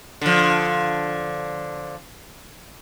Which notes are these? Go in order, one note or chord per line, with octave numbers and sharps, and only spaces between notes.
D3 F3